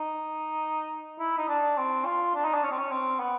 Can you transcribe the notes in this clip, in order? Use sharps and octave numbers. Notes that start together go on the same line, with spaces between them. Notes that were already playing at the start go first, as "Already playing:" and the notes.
Already playing: D#4
E4
D#4
D4
C4
F4
D4
D#4
D4
C#4
C4
C#4
C4
B3